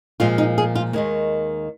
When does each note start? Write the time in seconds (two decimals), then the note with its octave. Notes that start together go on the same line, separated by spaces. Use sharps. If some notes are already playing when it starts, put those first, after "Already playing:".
0.20 A#2 F3 G#3 F4
0.38 D#4
0.58 G#4
0.75 F4
0.93 D#2 D#3 G#3 A#3